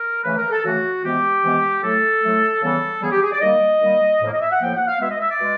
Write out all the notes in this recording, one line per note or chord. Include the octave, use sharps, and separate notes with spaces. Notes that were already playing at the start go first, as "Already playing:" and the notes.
Already playing: A#4
C#3 E3 A3 B4
A#4
A4
C#3 E3 A3 F#4
C3 E3 G#3 B3 G4
C3 E3 G#3 B3
A2 F#3 A3 A4
A2 F#3 A3
C#3 E3 G3 B3 A4
C#3 E3 G3 B3 G#4
G4
G#4
D5
D#3 G3 A#3 D#5
D#3 G3 A#3
A2 F3 A#3
D#5
E5
F#5
A2 F3 A#3 G5
F#5
F5
B2 G#3 B3 E5
D#5
E5
D5
B2 G#3